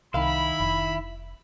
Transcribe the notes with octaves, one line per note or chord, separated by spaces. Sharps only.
C2 D#3 E4 F5 B5
F1